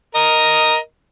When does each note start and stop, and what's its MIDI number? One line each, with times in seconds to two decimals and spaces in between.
0.15 0.76 70
0.15 0.76 75